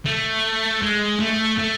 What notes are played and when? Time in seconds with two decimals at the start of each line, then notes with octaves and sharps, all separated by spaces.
0.06 A3
0.82 G#3
1.20 A3
1.59 A3